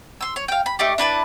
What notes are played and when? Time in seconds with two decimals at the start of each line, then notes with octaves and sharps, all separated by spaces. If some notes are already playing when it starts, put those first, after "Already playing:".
0.21 C6 E6
0.36 C#5
0.48 F5 G5
0.66 B5
0.79 A3 D#4 G4 D5
0.98 D4 E4 B4 A5